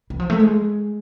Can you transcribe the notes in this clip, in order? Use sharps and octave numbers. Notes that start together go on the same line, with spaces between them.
E3
F3
A3
G#3